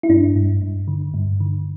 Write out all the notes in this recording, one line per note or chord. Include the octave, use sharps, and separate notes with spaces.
E4
G2 D4
G2
G2
D3
G2
D3